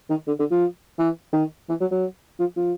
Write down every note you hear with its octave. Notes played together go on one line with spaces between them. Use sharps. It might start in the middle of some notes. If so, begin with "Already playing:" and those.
D#3
D3
D3
F3
E3
D#3
E3
F#3
F#3
F3
F3